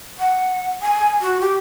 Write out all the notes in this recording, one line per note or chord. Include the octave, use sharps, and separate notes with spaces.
F#5
G#5
F#4
G4